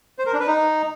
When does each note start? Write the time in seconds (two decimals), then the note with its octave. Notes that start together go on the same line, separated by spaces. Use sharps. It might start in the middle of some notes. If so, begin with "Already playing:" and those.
0.19 C5
0.26 A#4
0.33 D4
0.40 B4
0.47 D#4